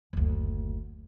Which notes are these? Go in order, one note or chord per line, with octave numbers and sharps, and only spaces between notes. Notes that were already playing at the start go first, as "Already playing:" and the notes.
F#1 D2